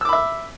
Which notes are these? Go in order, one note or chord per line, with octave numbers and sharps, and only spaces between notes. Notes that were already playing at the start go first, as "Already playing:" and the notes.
E5 B5 D6 E6